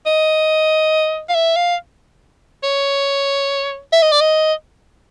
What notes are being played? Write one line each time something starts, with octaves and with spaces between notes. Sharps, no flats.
D#5
F5
E5
F5
C#5
E5
D#5
D5
D#5